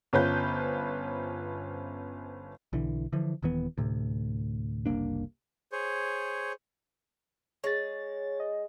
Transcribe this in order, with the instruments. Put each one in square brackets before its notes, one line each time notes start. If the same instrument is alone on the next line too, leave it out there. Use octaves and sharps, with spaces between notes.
[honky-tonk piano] G1 C#4 F4 B4 C5 G6
[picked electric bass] B1 D3 E3
D3 E3 F3
D#1 D#3 E3 B3
D2 A2 C3
F#1 C2 A#3 D4
[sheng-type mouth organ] G#4 C5 C#5
[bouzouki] G#3 [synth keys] C#5 A6
[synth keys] D#5